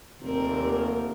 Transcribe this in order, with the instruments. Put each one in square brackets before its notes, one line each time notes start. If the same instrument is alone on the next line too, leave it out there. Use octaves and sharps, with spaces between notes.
[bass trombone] F1 [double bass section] D#2 [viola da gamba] C4 A#4